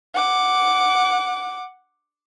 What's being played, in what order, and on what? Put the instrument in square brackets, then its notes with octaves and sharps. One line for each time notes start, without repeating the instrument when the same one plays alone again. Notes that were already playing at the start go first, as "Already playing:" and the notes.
[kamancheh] F#5 D6